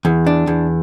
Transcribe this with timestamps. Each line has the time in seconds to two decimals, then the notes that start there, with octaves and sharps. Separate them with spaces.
0.05 E2
0.27 D4
0.47 E2